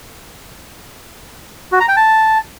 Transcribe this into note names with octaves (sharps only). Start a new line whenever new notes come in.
F#4
A#5
G5
A5